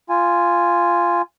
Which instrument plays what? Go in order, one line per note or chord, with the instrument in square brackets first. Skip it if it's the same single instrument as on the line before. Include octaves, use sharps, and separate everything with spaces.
[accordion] F4 G#5